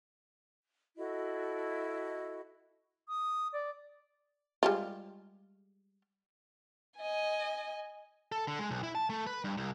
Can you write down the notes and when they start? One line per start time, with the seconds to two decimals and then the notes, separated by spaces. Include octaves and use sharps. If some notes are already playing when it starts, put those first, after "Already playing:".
0.97 E4 F#4 A4 D#5
3.08 D#6
3.53 D5
4.63 G3 G#3 F4
6.98 D#5 G#5
8.32 A4
8.48 D3
8.59 G#3
8.71 B1
8.83 E4
8.95 A5
9.10 A3
9.27 B4
9.44 G2
9.57 C2